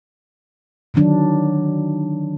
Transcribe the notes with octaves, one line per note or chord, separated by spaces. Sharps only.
D3 D#3 F#3 D4